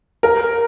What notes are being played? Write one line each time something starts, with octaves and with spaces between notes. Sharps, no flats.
A#4